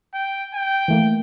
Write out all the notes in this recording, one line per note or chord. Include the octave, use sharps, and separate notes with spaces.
G5
G5
E3 A3 A#3